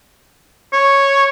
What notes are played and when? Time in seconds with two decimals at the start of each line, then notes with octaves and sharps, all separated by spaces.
0.73 C#5